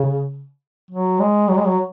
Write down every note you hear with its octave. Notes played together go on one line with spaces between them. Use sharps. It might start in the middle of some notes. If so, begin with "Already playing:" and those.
Already playing: C#3
F#3
G#3
F#3
G#3
F#3